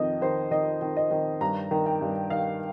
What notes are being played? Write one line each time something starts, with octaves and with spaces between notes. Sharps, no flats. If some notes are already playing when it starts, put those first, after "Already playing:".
Already playing: F2 D#3 D#5
D#3 C5
D#3 D#5
D#3
D#5
D#3
G2 A#5
D#3
G5
G2
D#3 F5